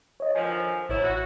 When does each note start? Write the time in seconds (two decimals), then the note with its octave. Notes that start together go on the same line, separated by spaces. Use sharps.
0.20 C#5 D#5
0.35 D3 D#3 F3 C5 G#5
0.89 A1 F#3 B3 E4 C#5
1.04 F#4